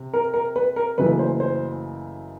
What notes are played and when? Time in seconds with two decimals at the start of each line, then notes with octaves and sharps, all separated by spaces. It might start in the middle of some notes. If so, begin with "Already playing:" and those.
Already playing: C3
0.14 A#4
0.34 A#4
0.56 B4
0.76 A#4
0.98 F#1 F#2 C#3 E3 A3 B4
1.19 C5
1.40 C5